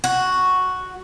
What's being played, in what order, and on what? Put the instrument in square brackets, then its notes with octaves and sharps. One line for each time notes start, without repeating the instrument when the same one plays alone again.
[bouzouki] F#4